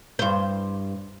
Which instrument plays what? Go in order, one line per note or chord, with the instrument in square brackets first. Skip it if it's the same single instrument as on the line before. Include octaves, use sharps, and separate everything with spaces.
[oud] G2 C5